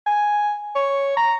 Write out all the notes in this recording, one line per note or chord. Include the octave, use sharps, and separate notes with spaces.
G#5
C#5
A#5